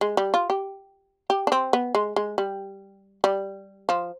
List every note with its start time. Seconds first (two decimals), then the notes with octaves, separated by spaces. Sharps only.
0.01 G#3
0.17 G3
0.34 F4
0.50 G4
1.30 G4
1.47 D4
1.52 C4
1.73 B3
1.95 G#3
2.16 G#3
2.38 G3
3.24 G3
3.89 F3